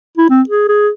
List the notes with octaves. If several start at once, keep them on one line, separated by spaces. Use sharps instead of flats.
E4
C4
G#4
G#4